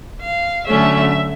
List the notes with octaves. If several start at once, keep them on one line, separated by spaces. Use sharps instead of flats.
F5
D3 F#3 A3 C#4 E5